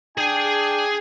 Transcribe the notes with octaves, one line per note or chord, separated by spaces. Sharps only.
D4 G#4 G5 G#5